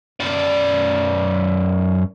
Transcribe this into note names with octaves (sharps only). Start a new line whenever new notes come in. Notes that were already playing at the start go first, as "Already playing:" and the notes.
F#2 D5